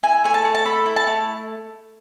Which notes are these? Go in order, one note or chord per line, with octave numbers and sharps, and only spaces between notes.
E4 G#5
A3 G#5
A5
A3
A5
A4 B5
E4
A5
A3